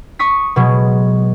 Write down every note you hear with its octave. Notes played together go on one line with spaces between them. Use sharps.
C#6 D#6 B6
B2 F#3 G#3 B3